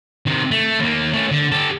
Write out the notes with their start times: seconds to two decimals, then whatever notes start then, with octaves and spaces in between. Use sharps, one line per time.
0.26 C3 D#3
0.51 A3
0.79 D#2 A#3
1.13 A3 C#4
1.32 D3
1.52 G4 A4